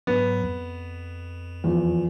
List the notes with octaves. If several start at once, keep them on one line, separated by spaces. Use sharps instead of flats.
G#2 F#3 B3
F2
E2 F3